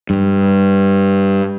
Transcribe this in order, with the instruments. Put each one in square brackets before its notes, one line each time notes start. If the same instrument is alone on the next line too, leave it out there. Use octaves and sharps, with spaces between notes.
[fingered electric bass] G2